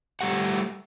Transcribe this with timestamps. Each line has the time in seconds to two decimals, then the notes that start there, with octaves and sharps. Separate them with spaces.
0.21 G3 A3 G4 F#5